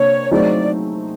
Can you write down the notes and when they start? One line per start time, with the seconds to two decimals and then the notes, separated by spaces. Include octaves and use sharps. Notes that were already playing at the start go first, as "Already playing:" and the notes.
Already playing: C3 A#3 D4 C#5
0.31 F#3 A3 C4 D#4 G#4 D5